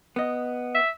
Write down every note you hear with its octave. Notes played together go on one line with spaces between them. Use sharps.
B3 D#5
E5